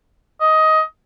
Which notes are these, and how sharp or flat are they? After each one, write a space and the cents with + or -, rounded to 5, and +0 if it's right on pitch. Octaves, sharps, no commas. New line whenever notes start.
D#5 +15